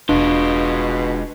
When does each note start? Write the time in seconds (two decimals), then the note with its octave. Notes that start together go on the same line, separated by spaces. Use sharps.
0.09 E1 B2 G#3 D4 F4